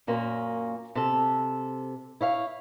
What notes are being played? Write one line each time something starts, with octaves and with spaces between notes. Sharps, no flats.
F#2 A#2 A#3 C#4
C3 A4
E4 C#5 F5